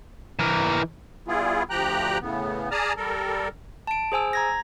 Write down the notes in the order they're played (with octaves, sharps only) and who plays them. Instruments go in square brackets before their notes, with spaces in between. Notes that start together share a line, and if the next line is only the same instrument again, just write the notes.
[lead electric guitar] E3 A#4
[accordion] G3 B3 E4 F4 G#4
D2 F3 G4 G5 A#5 F#6
A2 C#3 B3
G#4 D5 A5 A#5 D#6 F6
G3 A4 A#4
[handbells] A5 D7
G#4 C5 G#5 E6
A#5 G#6 A#6